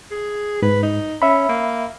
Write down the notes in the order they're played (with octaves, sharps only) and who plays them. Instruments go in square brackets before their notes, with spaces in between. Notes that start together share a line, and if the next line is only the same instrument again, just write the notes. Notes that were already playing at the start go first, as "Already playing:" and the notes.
[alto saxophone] G#4
[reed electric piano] G#2 [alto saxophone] B4
[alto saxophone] D#4
[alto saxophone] C#4 [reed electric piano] E5 B5
[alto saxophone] A#3